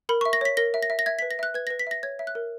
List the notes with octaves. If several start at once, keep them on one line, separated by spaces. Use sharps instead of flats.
A#4 B5
C#6
E5
A#6
C#5 B6
A#4 A#6
E5
A#6
E5
A#6
E5 G#6
B6
B4
A#6
E5 F#6
B4 G#6
A#6
B4
B6
E5 A#6
C#5 G#6
E5
F#6
A#4